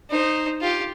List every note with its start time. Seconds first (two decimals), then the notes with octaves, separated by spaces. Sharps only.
0.10 D#4 C5
0.61 F4 G4